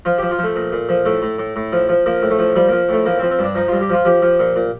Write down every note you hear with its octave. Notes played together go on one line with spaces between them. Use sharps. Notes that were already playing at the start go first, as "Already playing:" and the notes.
F3 F4
F3 G4
F4
F3 A3
A#2
A#2
F3
A2 A3
A2
A2
A2
F3
F3
F3 A#3
A2
A3
F3
F3 G3
F3 A#3
A2 A3
F3 A#3
C4
F3
C4
G2 D4
F3 D#4
G2 F4
G4
F3 F4
F3 G4
F3
A#2
A#2